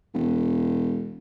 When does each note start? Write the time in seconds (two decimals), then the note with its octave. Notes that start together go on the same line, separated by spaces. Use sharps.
0.14 E1